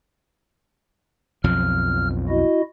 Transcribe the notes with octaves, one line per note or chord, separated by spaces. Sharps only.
B1 F2 F3 F6
E4 F#4 D#5